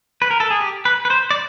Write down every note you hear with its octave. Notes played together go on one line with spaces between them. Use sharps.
B4
A#4
A4
G#4
G4
B4
B4
C5
D5